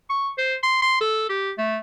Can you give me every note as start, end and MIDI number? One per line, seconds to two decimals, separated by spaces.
0.10 0.30 85
0.38 0.55 72
0.63 0.79 84
0.82 0.97 84
1.01 1.25 69
1.29 1.51 67
1.58 1.77 57